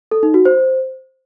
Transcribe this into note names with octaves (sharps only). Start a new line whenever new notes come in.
A4
D#4
F#4
C5